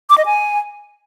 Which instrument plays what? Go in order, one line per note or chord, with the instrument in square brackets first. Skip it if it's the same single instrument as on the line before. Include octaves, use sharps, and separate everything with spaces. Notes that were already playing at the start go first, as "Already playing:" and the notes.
[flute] D6
D#5
G#5